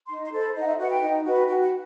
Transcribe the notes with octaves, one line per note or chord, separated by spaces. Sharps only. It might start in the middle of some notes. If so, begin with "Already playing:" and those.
D#4 C6
C6
A4 C5
B5
D#4 D#5
F#5
E5
F#4 B4 F#5
G5
D#4
F#4 B4
F#4 G5
F#5